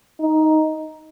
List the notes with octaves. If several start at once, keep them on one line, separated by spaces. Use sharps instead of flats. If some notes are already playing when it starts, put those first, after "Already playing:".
D#4